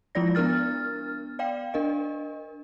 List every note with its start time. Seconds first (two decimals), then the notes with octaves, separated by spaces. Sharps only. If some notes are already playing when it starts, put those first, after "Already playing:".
0.15 F3 G#3 E4 F4 D5 A#6
0.35 B3 D4 A#4 F6 A6
1.39 D5 F5 G5
1.74 D4 A#4 D#5